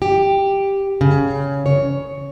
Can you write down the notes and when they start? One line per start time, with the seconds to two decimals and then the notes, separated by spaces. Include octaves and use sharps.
0.02 G4
1.01 C#3
1.66 C#5